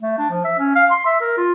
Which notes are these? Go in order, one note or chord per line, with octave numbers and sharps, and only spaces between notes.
A3
D4
F3
E5
C#4
F5
C6
E5
A#4
F4